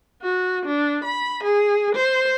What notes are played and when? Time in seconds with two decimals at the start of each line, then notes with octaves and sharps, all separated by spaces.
0.22 F#4
0.65 D4
1.04 B5
1.43 G#4
1.95 C5